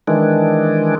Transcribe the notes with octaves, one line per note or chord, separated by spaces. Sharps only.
D#3 E3 G#3 D4